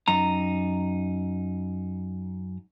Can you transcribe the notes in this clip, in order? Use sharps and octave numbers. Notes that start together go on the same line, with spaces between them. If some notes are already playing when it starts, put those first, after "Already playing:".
F#2 D#4 A#5